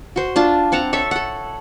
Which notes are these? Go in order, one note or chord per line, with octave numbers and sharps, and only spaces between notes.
F#4 C5
D4 F4 A5
C4 F#5 A5 A#5
A4 C#5 E5 A5
A4 F#5